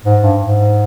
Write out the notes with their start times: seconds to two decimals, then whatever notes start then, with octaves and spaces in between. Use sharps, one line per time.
0.05 G#2
0.22 G2
0.40 G#2